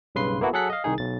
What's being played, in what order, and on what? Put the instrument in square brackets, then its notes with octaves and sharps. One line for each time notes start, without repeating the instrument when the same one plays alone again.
[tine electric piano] B1 G2 C#3 B4 C6 C7
A#3 B3 E4 F#4 A4
F#3 G#4 A4 F#5 F#6 B6
D#5 F5
C2 D#3 D#4 G#4
B1 A6